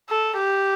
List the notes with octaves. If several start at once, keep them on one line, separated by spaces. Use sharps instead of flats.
A4
G4